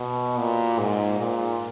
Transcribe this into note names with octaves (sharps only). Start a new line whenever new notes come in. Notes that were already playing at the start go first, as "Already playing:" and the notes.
Already playing: B2
A#2
G#2
A#2